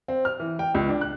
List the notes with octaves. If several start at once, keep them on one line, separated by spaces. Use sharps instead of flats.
C4
F6
E3
G5
C#2
D4
F#6